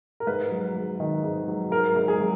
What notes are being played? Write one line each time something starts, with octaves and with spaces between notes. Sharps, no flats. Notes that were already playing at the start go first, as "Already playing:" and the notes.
A#4
G#2 B4
F#3
G#2
D#3
G#2
F#3
G#2 A#4
G#2
G#4
F#3